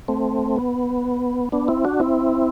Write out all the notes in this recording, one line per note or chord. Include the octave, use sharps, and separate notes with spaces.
A3 C4
B3
B3 D4
C4 E4
D4 F#4
C4 E4